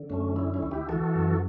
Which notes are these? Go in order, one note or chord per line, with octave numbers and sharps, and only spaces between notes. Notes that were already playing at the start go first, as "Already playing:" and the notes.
Already playing: D3
F#2 A3 C#4
D3 C#4 E4
C#4 E4
D2
E4 G4
E3 F#4 A4
F#2